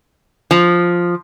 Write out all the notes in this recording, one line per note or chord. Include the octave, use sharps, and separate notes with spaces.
F3